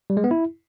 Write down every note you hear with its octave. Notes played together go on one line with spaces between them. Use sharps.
G3
G#3
B3
E4